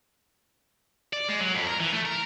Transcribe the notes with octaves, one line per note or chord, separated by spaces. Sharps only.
D5
G#3
F#3
F2
A#4
E3
A3
A#4